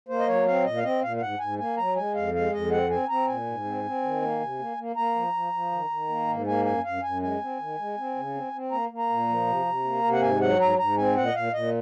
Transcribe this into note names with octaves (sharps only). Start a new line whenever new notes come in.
A#3 C5
D#5
F#3 C#5
C4 F5
A#2 D#5
F5
C4 D#5
A#2 F5
F5
G#2 F#5
G#2 G#5
A#3 G#5
F#3 A#5
G#3 G#5
F2 F5
G#3 F5
F2 D#5
C4 F#5
C4 G#5
C4 A#5
A#2 G#5
G#2
C4
C4
D#3
A#3
C3
A#3
A#3
A#3 A#5
F3
F3
F3
D#3
D#3
A#3
G#2
A#3 G#5
F#2 G#5
F#2 F5
F#2 G#5
G#3 G#5
C4
D#3
G#3
C4
C#3
C4
C4
A#3 A#5
A#3
A#5
A#2
F3
C3
C3
A#3
C3
F#5
G#2 G#5
F#3 F#5
G#2 A#5
G#2 A#5
C4 G#5
A#2 F#5
D#5
A#2 F5
A#2 D#5